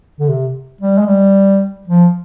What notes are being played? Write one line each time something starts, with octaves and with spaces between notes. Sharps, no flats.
D3
C3
G3
G#3
G3
F3